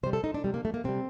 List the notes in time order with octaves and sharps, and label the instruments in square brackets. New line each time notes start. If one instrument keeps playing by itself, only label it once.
[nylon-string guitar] C3 C5
G3
A4
D#4
D4
C3 G3
A#3
A3
A#3
C3 G3 C4